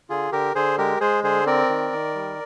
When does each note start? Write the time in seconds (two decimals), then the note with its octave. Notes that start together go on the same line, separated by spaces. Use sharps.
0.09 D3 F4 G#4
0.32 D3 G4 A#4
0.55 D3 G#4 C5
0.78 G#3 G4 A#4
1.01 G#3 G#4 C5
1.24 D3 G#4 C5
1.47 C4 A#4 D5
1.69 D#3
1.92 D#3
2.15 G3